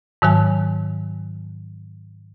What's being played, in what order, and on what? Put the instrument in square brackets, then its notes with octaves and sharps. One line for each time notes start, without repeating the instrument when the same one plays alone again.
[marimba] G#2 D#3 F#3 G#5